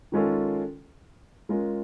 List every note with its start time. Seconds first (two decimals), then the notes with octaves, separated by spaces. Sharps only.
0.12 D#3 G#3 C#4 F4 A4
1.49 G#3 C#4 F4 A#4